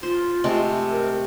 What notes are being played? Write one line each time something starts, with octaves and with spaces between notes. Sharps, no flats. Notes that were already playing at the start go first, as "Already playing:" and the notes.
F4 C5
C3 G#3 A3
A#4